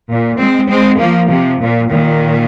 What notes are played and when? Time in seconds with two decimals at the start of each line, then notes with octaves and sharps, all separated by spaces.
0.10 A#2
0.39 G#3 C4
0.70 G#3 C4
0.99 F3 A#3
1.30 C3 F3
1.60 A#2
1.91 A#2 D#3